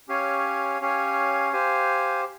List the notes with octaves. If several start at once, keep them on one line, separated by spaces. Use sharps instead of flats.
C#4 G4 C#5 F5 G#5
C#4 G4 C#5 F5 G#5
G4 C5 F5 G#5